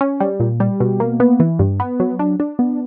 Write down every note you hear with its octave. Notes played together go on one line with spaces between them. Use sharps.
C#4
G3
A#2
G3
B2
A#3
B3
E3
G2
B3
F#3
D4
D4
B3